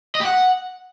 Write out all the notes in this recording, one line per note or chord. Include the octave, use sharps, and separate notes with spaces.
D#5
G4
F#5